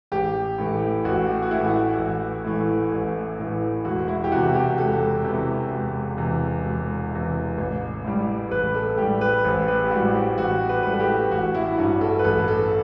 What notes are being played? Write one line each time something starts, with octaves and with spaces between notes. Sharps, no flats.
A1 G4
A2 E3 A3
A1 F#4
F#4
A2 E3 A3 E4
A1
A2 E3 A3
A1
A2 E3 A3
E1 F#4
E4
G4
E2 C3 F#4
G4
E1 A4
E2 C3
E1
E2 C3
E1
E2 C3
A1
A2 G3
A1 B4
A4
A2 G3 G4
B4
A1 C5
B4
G4
A2 G3 F#4
G4
A1 F#4
B4
A2 G3 B4
A4
G4
A1 F#4
E4
E4
G2 F#3 F#4
A4
B4
A1 A4
A4